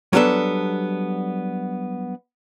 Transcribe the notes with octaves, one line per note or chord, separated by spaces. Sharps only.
F#3 G3 B3 D4 A4